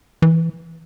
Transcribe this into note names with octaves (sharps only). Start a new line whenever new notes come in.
E3